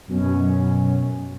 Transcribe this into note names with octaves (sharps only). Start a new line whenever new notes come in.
F#2 B2 F#3 C#4